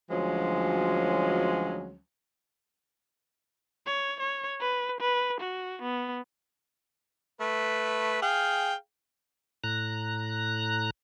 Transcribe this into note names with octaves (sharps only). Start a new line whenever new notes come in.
D2 F3 F#3 G#3 C#4
C#5
C#5
B4
B4
F#4
B3
A3 B4
G#4 F5 G5
A2 A#5 F#6